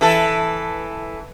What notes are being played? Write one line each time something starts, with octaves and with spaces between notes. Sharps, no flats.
E3 A4